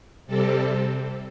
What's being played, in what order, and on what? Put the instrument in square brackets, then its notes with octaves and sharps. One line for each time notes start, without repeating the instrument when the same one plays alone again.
[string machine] C3 G3 C4 A4